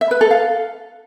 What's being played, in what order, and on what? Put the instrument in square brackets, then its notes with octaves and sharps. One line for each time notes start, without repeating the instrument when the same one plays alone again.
[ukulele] E5
B4
A4
F5